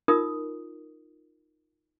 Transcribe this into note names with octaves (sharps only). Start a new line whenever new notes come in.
D#4 F4 A#4 D#6